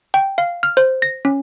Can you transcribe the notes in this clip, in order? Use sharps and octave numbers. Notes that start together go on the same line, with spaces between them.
G5
F5
F6
C5
A#6
C#4